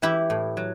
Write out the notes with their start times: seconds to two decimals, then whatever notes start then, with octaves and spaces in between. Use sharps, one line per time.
0.02 E3 E4 G4
0.30 A2
0.57 F#3